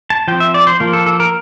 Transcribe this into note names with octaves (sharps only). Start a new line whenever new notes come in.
A5
F3 C4 G5
E5
D5
C5
F3 A#3
A4
A4
A#4